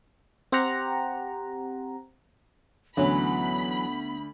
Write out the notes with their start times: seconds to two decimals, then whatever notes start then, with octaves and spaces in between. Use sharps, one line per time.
0.52 C4 G4 C5 F#5 A#5
2.97 D2 E3 F#3 B3 C#4 B5